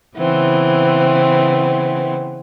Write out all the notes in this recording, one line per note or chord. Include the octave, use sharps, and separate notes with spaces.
C#3 E3 B3 C4